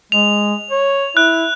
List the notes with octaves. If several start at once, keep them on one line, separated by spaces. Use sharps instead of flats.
G#3 F7
C#5
E4 F#6